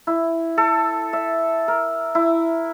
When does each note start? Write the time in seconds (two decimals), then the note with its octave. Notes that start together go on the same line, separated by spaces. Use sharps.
0.07 E4
0.58 A4
1.13 E5
1.68 A#4
2.15 E4